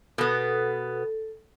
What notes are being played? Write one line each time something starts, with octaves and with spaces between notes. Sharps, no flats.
B2 B3 A4